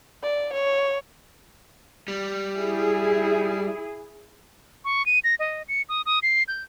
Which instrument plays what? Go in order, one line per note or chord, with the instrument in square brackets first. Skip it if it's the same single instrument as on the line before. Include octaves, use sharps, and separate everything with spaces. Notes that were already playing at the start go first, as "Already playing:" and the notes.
[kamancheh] D5
C#5
[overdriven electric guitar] G3
[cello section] E4 G#4
[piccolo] C#6
D#7
A#6
D#5
C#7
D#6
D#6
C7
G6